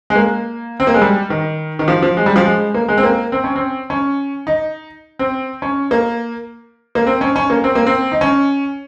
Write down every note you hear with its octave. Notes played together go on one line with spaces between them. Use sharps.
G#3
A#3
C4
A#3
G#3
G3
D#3
D#3
F3
F3
G#3
G3
F3
G#3
A#3
G#3
C4
A#3
C4
C#4
C4
C#4
D#4
C4
C#4
A#3
A#3
C4
C#4
C#4
A#3
C4
A#3
C4
D#4
C#4